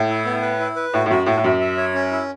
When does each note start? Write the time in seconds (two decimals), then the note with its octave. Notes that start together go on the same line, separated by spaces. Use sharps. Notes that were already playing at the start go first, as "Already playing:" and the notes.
Already playing: A2
0.09 E4
0.25 B3
0.42 B4
0.60 E4
0.76 B4
0.93 A2 F#4
1.06 A2
1.10 F#2 F#4
1.26 A2 F#4
1.37 A2
1.44 F#2 E5
1.60 E5
1.77 C#5
1.94 C#4
2.11 E4